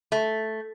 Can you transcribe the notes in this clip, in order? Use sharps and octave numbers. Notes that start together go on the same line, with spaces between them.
A3